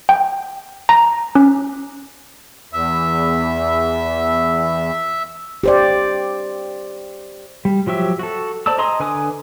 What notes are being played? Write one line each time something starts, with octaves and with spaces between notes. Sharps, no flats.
G5
A#5
C#4
E2 E5
G4 C5 D5
G3
F3 F#3 G4 E5
F#4 A4
C5 D5 A5 D6 E6
G#4 D#5 A#5 C6 D#6
D3 B4 G#5 D6 D#6